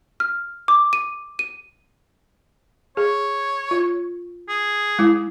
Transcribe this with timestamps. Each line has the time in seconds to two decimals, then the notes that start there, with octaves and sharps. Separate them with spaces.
0.20 F6
0.68 D6
0.93 D#7
1.39 D#7
2.97 G#4 C#5
3.71 F4
4.49 G#4
4.99 G#3 E4